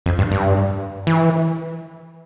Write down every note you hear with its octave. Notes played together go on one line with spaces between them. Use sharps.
F2
G2
G2
E3